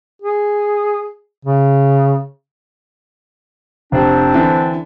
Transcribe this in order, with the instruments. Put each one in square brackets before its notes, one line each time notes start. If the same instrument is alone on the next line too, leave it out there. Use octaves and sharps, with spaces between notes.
[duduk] G#4
C#3
[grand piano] F1 [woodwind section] C4 D4
[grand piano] D3 E3